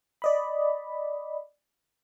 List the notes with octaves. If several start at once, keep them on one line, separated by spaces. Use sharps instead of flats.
D5 D#5 B5